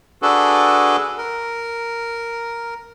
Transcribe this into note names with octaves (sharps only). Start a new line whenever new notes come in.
D4 F#4 G#4 A4 B4
A#4